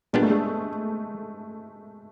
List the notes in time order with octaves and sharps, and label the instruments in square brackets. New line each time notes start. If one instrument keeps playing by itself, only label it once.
[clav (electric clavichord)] A#2 G3 B3 D4 [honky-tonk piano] G#3
[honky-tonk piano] A3
G#3